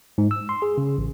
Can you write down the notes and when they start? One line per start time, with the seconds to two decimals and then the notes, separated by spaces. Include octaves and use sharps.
0.18 G#2
0.31 E6
0.49 C6
0.62 G#4
0.78 C#3
0.98 A1